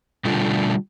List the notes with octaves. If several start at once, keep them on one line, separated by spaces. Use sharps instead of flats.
B2 D3 G3 A3 D4 F4